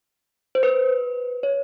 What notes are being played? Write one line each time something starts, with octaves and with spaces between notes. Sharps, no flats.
C5
B4
C#5